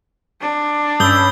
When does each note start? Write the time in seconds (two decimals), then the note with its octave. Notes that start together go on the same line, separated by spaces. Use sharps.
0.41 D4
1.00 G2 C#4 B5 D#6 E6 G6 G7